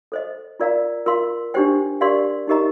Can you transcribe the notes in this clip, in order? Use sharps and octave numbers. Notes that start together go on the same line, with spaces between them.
A4 C5 D#5
F4 A#4 D5 F5 A#5
F4 A#4 F5 C6
D4 G4 C5 G5
G4 A#4 D5 F5 C6
D#4 G4 A#4 D#5 A#5